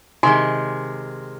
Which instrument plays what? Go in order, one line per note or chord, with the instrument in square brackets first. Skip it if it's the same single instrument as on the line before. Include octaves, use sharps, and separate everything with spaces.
[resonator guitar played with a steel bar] C3 D#3 G#3 [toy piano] G#5 C6